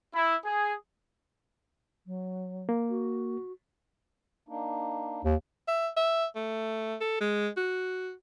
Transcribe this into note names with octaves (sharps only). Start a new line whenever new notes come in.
E4
G#4
F#3
A#3
F#4
A#3 D4 D#4
D#2
E5
E5
A3
A4
G#3
F#4